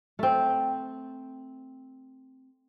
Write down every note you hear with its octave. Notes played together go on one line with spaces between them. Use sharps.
A3 C4